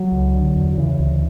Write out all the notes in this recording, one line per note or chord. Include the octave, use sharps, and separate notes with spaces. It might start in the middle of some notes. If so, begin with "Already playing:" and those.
Already playing: F#3
C#2
D3
E2
C#3 E3
D2